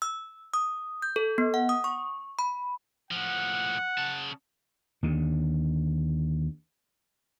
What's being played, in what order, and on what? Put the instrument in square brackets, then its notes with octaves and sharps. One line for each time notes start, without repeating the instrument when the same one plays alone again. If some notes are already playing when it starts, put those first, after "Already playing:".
[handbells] E6
D#6
G6
A4
B3
F#5
D#6
C#6
B5
[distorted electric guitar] A2 F3 [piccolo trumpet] F#5
[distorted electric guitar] C#3 A5
[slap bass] D#2 D3